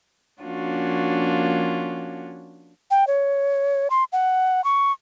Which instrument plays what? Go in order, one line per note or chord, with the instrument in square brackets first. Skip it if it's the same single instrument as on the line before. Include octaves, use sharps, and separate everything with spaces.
[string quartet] F3 A#3 C#4 D4 F4 F#4
[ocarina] G5
C#5
C6
F#5
C#6